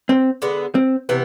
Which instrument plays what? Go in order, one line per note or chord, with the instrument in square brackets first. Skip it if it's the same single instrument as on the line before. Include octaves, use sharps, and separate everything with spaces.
[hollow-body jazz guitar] C4
[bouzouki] D3 G#3 B3
[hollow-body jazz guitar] C4
[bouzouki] C3 E3 B3